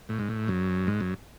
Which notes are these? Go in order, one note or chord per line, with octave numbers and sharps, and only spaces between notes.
A2
G#2
A2
F#2
G#2
F#2